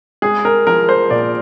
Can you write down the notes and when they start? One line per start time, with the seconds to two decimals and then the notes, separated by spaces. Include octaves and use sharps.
0.22 G#3 G#4
0.45 A#4
0.67 F3 A#4
0.89 C5
1.10 A#2 D5